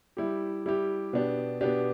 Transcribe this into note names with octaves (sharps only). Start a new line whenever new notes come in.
G3 E4 G4
G3 E4 G4
B2 B3 D4 G4
B2 B3 D4 G4